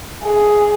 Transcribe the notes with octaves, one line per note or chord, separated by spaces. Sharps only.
G#4